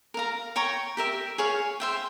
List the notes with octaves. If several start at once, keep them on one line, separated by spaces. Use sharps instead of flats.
A#4 F5 A#5
C#5 G5 A#5 C#6
G4 A#4 E5
G#4 C#5 F5
C5 E5 G5